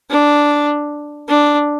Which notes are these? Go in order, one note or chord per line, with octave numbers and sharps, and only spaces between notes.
D4
D4